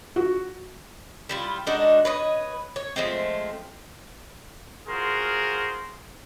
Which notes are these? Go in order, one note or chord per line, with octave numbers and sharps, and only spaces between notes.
F#4
G3 E4 F4
G#3 D4 D#4 F#4
B4 C#5 D#5
C#5
F3 G#3 A3 C4
F4 F#4 G#4 A#4 C5